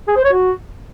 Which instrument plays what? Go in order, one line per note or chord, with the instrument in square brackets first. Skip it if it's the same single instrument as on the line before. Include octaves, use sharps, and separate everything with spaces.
[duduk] G#4
C5
C#5
F#4